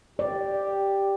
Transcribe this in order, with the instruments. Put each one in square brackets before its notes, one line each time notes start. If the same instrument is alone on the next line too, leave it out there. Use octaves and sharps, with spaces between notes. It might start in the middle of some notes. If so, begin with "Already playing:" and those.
[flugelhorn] G4 [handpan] D5